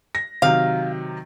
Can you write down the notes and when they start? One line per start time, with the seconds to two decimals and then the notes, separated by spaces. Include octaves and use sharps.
0.15 A#6
0.42 C3 D#3 F#3 F5